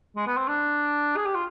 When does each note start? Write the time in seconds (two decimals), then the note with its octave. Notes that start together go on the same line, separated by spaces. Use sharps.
0.16 G#3
0.27 B3
0.37 C4
0.48 D4
1.16 G#4
1.25 G4
1.35 F4